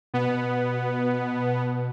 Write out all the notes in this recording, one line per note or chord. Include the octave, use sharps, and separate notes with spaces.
B2 B3